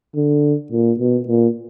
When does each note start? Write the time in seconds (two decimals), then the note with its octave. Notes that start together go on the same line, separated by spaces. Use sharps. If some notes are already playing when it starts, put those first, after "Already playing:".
0.15 D3
0.72 A#2
0.99 B2
1.28 A#2